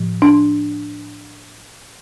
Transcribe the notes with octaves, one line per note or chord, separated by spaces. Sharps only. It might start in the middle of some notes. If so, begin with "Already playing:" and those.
Already playing: A2 F3
D4